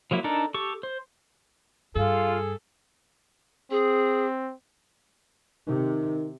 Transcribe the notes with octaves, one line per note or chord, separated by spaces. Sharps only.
F3 F#3 A#3 E4
D4 D#4 A4 A#4
G4 A4 C#6
C5
G2 F4 G#4 A4
C4 G#4
C3 D#3